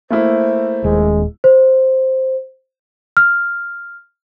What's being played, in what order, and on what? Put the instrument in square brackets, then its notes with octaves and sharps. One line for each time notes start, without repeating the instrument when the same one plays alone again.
[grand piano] A3 A#3 E4 [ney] C5
[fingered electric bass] D#1 [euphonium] G#3
[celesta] C5
F6